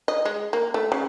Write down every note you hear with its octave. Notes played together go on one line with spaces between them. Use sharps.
D#5
G#3
A#3
A3
C#3